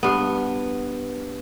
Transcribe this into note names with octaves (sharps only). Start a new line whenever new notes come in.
G2 B3